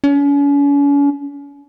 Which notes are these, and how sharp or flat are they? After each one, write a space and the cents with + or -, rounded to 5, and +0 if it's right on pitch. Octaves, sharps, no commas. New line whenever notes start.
C#4 +40